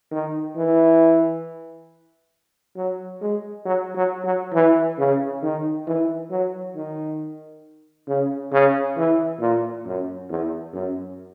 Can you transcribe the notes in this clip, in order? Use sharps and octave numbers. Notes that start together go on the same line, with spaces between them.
D#3
E3
F#3
G#3
F#3
F#3
F#3
E3
C#3
D#3
E3
F#3
D#3
C#3
C#3
E3
A#2
F#2
E2
F#2